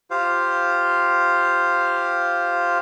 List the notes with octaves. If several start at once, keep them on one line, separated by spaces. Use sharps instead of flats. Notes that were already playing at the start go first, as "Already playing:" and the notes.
F4 G4 C5 F5